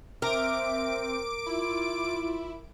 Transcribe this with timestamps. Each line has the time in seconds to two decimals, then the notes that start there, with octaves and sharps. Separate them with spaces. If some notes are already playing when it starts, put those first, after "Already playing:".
0.22 C4 A#4 E5 D6 D7
1.46 E4 F4